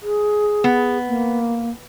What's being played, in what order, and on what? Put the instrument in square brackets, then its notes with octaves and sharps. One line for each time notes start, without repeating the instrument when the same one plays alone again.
[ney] G#4
[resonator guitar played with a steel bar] B3
[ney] A#3